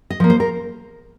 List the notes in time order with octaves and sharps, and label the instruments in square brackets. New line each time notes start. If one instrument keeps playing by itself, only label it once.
[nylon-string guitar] D#5
F3 A#3
C5
A#4